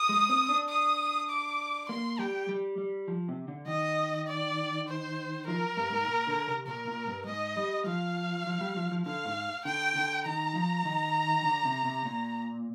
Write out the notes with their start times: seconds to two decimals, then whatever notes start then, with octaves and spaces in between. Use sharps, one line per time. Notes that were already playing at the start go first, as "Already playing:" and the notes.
Already playing: D#6
0.09 G#3
0.29 C4
0.49 D4
0.69 D#6
1.29 D6
1.89 A#3 C6
2.19 G3 G5
2.49 G3
2.78 G3
3.08 F3
3.28 C3
3.48 D3
3.68 D#3 D#5
4.27 D5
4.88 C5
5.47 F3 A#4
5.77 G2
5.92 G#2
6.07 A#2
6.27 D3
6.47 C3
6.67 A#2 A#4
6.87 A#2
7.07 G2
7.26 G#2 D#5
7.57 G3
7.86 F3 F5
8.47 F3
8.61 G3
8.76 F3
8.92 F3
9.05 D3 F5
9.25 G#2
9.65 D3 G5
9.96 D3
10.26 D#3 A#5
10.56 F3
10.85 D#3
11.45 D3
11.65 C3
11.85 C3
12.05 A#2